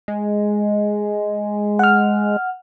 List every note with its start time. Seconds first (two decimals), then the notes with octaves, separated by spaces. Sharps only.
0.08 G#3
1.79 F#5 F6